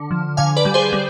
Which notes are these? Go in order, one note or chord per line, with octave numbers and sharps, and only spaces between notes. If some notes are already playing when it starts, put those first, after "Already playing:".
Already playing: D3
F3
D3 F5 G#5
B4 D5
G3
G#4 C5
G3